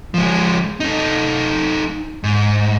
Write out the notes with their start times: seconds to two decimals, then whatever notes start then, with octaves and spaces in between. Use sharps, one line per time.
0.14 F3 G#3
0.80 A3 D#4
2.24 G#2